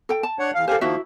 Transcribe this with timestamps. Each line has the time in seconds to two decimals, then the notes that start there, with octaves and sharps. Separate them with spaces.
0.09 A4 G5
0.23 A5
0.39 D4 C#5 F#5
0.55 E2 F5
0.68 G4 A4 C5 F5 G#5
0.81 D#3 F3 A#3 E4 F#4 E5